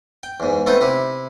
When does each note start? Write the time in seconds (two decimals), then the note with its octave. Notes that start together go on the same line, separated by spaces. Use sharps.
0.23 G5
0.40 E2 G#2
0.66 A3 B3 C4 D#4 G5
0.81 C3 E4